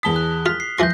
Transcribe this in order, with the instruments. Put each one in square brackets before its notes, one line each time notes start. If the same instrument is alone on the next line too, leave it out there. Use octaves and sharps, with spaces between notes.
[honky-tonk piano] E2 A5 B6 [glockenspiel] D#6 G7
[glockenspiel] F#6
[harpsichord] F4 [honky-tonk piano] F6 [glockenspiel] B6
[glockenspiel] C7
[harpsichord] E3 F3 C6 [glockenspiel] G6 A#6